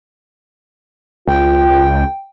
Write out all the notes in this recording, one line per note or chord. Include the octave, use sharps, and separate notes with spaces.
C#2 F4 G5